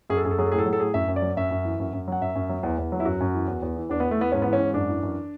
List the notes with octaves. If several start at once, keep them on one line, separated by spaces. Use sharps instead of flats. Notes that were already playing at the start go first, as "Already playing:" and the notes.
F#2 G#4
A4
F#2 G#4
A4
F#3 G#4
A4
A2 G#4
A4
F#3 G#4
A4
A2 G#4
F#2 E5
F#2
D5
F#3
F#2 E5
F#2
E3
F#2
F#2
F#3 F#5
F#2 E5
F#2
F#3
E2
E2
F#3
E4
F#2 F#4
F#2
E3
E2
E2
E3
E2 D4
B3
E2
A3
E3 B3
G#2 C#4
B3
E3
C#4
G#2
F#2 D4
E3
F#2